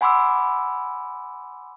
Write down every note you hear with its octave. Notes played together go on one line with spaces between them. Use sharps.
F#5 G#5 B5 C6 D6 E6